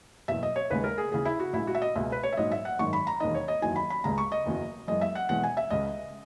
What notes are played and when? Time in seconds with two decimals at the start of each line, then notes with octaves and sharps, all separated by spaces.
0.28 F#1 E2 B2 E5
0.43 D#5
0.56 C#5
0.70 D#2 C#3 G#3 B4
0.84 A#4
0.98 G#4
1.12 D#2 C#3 E3 G#4
1.25 E4
1.40 F#4
1.53 A#1 A#2 G#3 E4
1.67 F#4
1.75 E5
1.82 D#5
1.96 C#2 B2 G#3 E5
2.12 B4
2.23 C#5
2.33 E5
2.37 A#1 G#2 F#3 D#5
2.52 E5
2.65 F#5
2.79 G#1 F#2 D#3 G#3 C#6
2.93 B5
3.07 A#5
3.20 E1 D#2 D#3 D#5
3.35 C#5
3.48 D#5
3.62 F#1 E2 D#3 F#3 G#5
3.76 B5
3.90 B5
4.04 C#2 C#3 G#3 A#5
4.18 C#6
4.32 D#5
4.45 F#1 E2 C#3 F#3
4.87 F#1 F#2 E3 G#3 D#5
5.01 E5
5.15 F#5
5.29 E1 E2 B2 G#3 F#5
5.43 G#5
5.57 E5
5.70 C#2 C#3 G#3 D#5